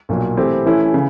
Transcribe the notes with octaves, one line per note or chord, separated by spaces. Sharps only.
B1 A#2 F#3
E3 A3 C4 E4 G4
E3 A3 C#4 E4
C#3 E3